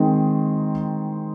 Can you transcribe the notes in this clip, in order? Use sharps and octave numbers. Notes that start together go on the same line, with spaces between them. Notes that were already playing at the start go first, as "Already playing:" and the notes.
Already playing: D#3 G#3 C4